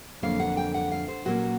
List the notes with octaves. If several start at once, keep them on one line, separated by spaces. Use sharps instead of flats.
F2 D3 F#3 A#3 F5
F#5
G5
F#5
F5
C5
A#2 F#3 A#3 C#4 F#4